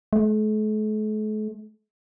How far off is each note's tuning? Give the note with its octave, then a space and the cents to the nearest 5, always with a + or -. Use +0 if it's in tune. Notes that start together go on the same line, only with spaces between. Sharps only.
A3 -45